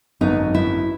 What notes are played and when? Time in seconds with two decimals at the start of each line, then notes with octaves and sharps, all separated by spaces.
0.21 G#1 F#2 D3 F#3 B3 D#4
0.55 E4